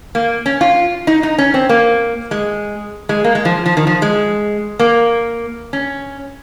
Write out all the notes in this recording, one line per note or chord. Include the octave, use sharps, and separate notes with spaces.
A#3
C#4
F4
D#4
D#4
C#4
C4
A#3
G#3
G#3
A#3
G#3
F3
F3
D#3
F3
G#3
A#3
C#4